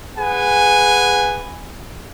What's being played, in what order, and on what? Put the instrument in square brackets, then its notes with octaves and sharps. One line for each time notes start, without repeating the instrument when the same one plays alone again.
[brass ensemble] G#4 B4 F#5 G#5